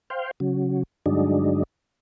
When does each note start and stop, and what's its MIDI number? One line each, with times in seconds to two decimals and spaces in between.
0.10 0.31 72
0.10 0.31 77
0.10 0.31 79
0.40 0.83 49
0.40 0.83 54
1.06 1.63 43
1.06 1.63 50
1.06 1.63 54
1.06 1.63 56
1.06 1.63 62
1.06 1.63 63